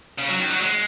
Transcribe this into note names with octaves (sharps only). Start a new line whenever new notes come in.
C#3
F#3
D#3
F#3
G#3